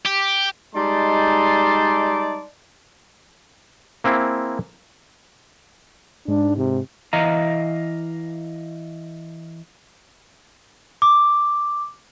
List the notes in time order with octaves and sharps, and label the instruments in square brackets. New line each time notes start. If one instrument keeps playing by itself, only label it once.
[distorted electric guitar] G4
[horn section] G3 G#3 D#4 D5 A5 C6
[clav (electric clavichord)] A#3 C4 E4 G#4
[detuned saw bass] G#2 [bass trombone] D4
[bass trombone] C3
[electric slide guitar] E3 D#5 F5 A#5
[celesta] D6